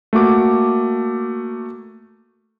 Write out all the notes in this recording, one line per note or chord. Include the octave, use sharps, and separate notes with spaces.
A3 A#3 F#4 D6